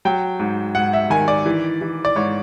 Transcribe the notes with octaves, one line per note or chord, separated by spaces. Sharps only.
F#3 G5
G#2
G#2 F#5
E5
D#3 G#5
D5
E3
E3
D5
G#2 C#5